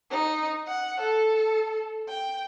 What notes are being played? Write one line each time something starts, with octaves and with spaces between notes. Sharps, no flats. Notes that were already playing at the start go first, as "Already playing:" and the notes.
D#4
F#5
A4
G5